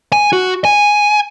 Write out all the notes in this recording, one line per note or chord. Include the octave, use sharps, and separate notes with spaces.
G#5
F#4
G#5